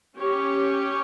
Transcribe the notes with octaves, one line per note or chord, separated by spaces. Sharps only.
C#4 G4 C#5